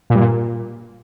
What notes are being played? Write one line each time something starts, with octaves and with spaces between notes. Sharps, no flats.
A#2
G2
A#2